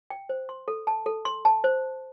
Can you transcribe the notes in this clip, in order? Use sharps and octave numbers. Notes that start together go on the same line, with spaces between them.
G5
C5
C6
A4
A5
A4
C6
A5
C5